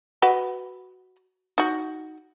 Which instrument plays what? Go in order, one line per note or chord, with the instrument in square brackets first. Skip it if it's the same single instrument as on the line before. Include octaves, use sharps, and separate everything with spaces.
[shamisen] F#4 B4 D#5
D#4 F#4